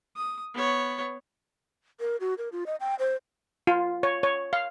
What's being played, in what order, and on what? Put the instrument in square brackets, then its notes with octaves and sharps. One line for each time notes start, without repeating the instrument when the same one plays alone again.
[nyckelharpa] D#6
B3 C#5
[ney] A#4
F#4
A#4
F4
D#5
G5
C5
[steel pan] F4
C#5
C#5
F5